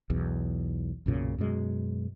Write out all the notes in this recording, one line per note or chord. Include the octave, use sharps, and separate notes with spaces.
B1 E2
B1 F#2 A#2 C#3
F#2 B2 G#3